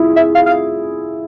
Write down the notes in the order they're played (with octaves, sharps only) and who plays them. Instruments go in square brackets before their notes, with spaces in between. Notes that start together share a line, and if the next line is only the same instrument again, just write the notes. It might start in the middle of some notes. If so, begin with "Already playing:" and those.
Already playing: [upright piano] E4 F4 G#4
[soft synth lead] E5
F5
F5